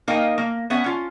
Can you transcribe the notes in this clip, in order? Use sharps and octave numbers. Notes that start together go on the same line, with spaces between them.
A#3 D#4 A#4 D#5 F5 G5
A#3
B3 C#4 E5 F#5
C#4 F4